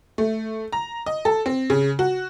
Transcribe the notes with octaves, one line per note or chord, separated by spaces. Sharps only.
A3
A#5
D#5
A4
C4
C#3
F#4